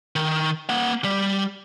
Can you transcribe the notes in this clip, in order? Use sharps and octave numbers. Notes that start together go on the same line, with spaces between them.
D#3
A#3 F#5
G3